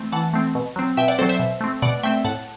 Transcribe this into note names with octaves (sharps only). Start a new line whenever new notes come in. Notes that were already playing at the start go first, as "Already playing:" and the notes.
Already playing: E3 A3 C4
E3 F#5 A5
A3 C4
B2
F#3 C4
B2 E5 G5
D5 F#5
F#3 C4 A4 C5
C5 E5
B2
A3 C4
B2 D5 F#5
A3 C4 E5 G5
A2 F#5 A5